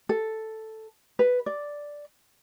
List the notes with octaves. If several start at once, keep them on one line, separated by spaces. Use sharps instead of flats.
A4
B4
D5